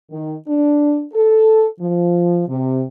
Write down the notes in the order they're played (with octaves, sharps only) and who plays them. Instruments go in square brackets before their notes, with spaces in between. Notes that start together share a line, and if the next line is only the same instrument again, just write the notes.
[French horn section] D#3
D4
A4
F3
C3